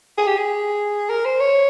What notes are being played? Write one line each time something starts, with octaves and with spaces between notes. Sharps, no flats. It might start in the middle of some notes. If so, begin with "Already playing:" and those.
G#4
G4
G#4
A#4
C5
C#5